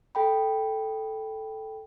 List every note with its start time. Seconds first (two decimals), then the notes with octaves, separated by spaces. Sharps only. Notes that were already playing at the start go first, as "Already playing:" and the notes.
0.15 A4 G5 B5